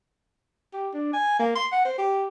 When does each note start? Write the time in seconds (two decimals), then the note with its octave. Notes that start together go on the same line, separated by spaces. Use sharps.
0.74 G4
0.94 D4
1.13 G#5
1.39 A#3
1.55 C6
1.72 F#5
1.85 C5
1.98 G4